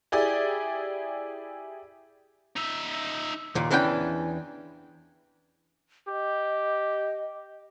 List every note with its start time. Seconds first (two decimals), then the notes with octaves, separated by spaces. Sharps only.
0.12 E4 G4 G#4 D5
2.56 D#4 E5
3.55 D#2 A#2
3.71 E2 E3 C#4 D4 F#4 G5
6.08 G4 D#5